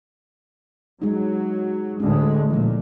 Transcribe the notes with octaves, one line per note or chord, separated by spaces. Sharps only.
F#3 G#3 D#4
D2 A2 G#3 C#4
A#2 E3 F3